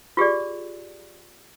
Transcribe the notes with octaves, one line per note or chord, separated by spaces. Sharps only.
F4 G4 G#4 D5